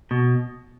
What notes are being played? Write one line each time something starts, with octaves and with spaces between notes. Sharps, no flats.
B2